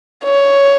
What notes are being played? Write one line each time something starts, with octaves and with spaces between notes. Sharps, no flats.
C#5